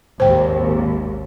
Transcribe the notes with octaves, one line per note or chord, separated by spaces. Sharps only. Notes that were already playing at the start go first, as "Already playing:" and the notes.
G#1 D#2 C5 G5